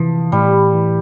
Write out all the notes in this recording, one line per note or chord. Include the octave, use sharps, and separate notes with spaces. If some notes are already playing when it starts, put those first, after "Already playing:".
Already playing: C3 E3 F3
A2 G3
E3